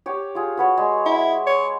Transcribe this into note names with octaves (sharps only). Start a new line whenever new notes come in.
G4 C#5
F4 G#4
F#4 B4 C#5
G#3
E4
C#5